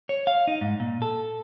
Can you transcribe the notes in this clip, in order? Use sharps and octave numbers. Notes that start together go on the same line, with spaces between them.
C#5
F5
D#4
G#2
A#2
A4